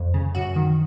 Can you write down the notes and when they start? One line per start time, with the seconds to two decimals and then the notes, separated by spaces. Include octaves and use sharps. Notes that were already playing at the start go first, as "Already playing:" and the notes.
Already playing: F2
0.14 C#3
0.35 F#2 F#4
0.56 D#3